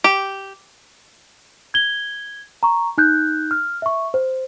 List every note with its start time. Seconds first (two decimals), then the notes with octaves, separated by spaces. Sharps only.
0.04 G4
1.74 G#6 G7
2.63 A#5 C#6
2.98 D#4 F#6 G6
3.51 F6
3.82 E5 C#6
4.14 C5